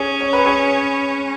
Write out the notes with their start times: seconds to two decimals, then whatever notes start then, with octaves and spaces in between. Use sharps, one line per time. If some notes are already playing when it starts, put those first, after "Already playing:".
Already playing: C#4 G#4 C#5
0.21 C#5
0.33 B4
0.45 G#4 C#5